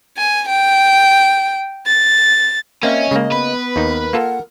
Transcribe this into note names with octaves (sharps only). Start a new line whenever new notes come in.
G#5
G5
A6
A#3 C4 C#4 D#5 E5
C#3 G#3 A#3
B3 B4
D#2 D#4 A#4
A#3 F4 A4 F#5